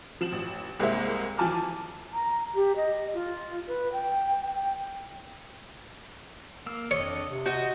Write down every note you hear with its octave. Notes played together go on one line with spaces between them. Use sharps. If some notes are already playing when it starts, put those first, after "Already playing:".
F3 E7 F#7
A1
C2 G#3 A#3 C5 E5
E3 F3 G#5 A5 D6 F6
A#5
G4
D#5
F4
B4
G5
G5
A#3 E6
F2 D4 C#5 D#5
C3
F#4 D#5 G6